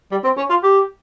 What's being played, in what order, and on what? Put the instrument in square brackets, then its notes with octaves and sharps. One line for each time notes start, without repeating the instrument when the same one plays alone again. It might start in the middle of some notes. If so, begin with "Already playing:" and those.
[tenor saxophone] G3
C4
C#4
F4
G4